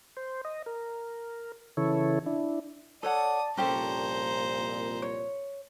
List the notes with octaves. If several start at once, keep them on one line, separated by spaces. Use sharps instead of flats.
C5
D#5
A#4
C#3 E3 E4 A4 C#5
D4 E4
A4 C#5 D5 F#5 A5 D#6
C2 F2 A#2 C#4 G4 A4 C5 A#5
C#5